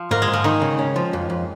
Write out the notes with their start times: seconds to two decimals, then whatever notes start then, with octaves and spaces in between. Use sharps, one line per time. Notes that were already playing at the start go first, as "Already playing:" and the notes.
Already playing: F3
0.11 G#2 A#3
0.22 G#3
0.28 G#2
0.33 F3
0.44 D#3 D#4
0.62 C#3
0.79 C#4
0.96 F3
1.13 F2
1.30 F2